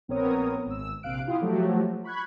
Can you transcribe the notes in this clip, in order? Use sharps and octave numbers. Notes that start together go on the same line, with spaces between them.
A#1 B3 C4 A#4 C#5 D#6
G#1 E6
A#1 C3 F5 F#6 D7
E4 F4 G4 F5 C6 D#6
F3 F#3 A3 F#4 G4
B5 C#6 F#6 G#6